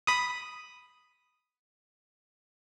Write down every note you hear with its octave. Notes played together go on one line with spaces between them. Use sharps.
B5 D#6